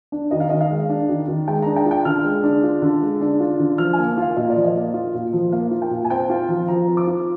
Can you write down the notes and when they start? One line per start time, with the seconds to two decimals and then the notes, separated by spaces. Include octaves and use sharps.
0.12 D4
0.31 D#3 D#5
0.40 F5
0.49 D#3 D#5
0.61 F5
0.70 G#3
0.89 D4
1.09 D#3
1.28 D#3
1.48 G#3 G5
1.62 D4 A#5
1.76 G5
1.86 F4
1.91 G5
2.05 D3 F6
2.25 G#3
2.44 D4
2.63 F4
2.82 D3
3.02 G#3
3.21 D4
3.40 F4
3.60 D3
3.78 F3 F6
3.93 G#5
3.99 A#3
4.18 F4 F5
4.37 A#2 D#5
4.50 D5
4.56 F3
4.64 D#5
4.75 A#3
4.94 F4
5.14 A#2
5.33 F3
5.52 A#3 F5
5.71 F4
5.82 G5
5.91 A#2
6.05 G#5
6.10 C4 G5
6.30 F4
6.49 F3
6.68 F3 A#5
6.87 C4
6.97 D6
7.07 F4